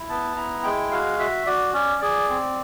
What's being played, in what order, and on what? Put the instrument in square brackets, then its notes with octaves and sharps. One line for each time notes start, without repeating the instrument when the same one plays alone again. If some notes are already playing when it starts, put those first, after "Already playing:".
Already playing: [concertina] E4
B3 A5
E4 A#5
G#3 G5
F#4 F5
F#4 E5
F#4 D5
C#4 D5
G#4 D5
C4